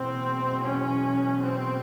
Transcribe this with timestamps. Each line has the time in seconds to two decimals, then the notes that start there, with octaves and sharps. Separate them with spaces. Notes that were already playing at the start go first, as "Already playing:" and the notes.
Already playing: F#1 E2 B2 C4
0.63 C#4
1.43 C4